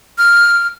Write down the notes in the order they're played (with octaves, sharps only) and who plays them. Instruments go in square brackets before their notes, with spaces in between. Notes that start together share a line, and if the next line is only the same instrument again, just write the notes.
[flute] F6